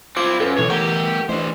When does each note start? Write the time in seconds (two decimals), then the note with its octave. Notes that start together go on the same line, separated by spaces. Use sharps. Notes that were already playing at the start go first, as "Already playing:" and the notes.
0.17 C4 E4 F4 D6
0.40 F#2 A4 B4
0.59 B1 E3 C#5
0.70 A3 G4 A#4 F#5
1.29 E3 A3 D4 C5